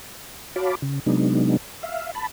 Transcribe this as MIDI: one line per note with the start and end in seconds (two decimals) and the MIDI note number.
0.56 0.75 66
0.56 0.75 73
0.56 0.75 77
0.56 0.75 81
0.56 0.75 83
0.56 0.75 86
0.82 0.99 49
1.06 1.57 48
1.06 1.57 54
1.06 1.57 56
1.06 1.57 59
1.06 1.57 62
1.06 1.57 63
1.83 2.11 76
1.83 2.11 77
2.15 2.27 81
2.15 2.27 83